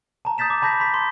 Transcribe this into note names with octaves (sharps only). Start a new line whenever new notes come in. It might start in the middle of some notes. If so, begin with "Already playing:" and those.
A5 A#5
D#6 G6 A6 B6 E7
D6
A5 B5 G6 A#6 B6
B5 C6 B6
C6